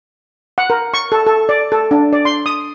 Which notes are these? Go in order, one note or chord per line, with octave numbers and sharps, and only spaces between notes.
F#5
A#4
C#6
A4
A4
D5
A4
D4
D5
C6
D#6